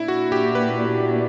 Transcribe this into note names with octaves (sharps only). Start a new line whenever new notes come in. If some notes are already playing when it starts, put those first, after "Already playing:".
Already playing: A#2 A#3 D4 E4
F#4
G4
B4